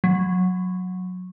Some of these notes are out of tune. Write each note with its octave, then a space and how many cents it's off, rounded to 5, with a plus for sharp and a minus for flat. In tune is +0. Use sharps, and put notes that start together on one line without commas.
F#3 -15